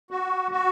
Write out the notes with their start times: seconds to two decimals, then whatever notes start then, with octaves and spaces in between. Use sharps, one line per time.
0.11 F#4
0.52 F#4